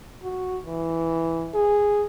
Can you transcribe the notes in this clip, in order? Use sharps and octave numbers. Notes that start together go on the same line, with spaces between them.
F#4
E3
G#4